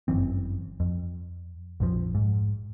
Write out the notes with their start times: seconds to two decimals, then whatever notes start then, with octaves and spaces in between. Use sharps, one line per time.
0.08 G1 F#2 E3 C4
0.80 F2
1.80 A#1 F2 F3
2.15 G#2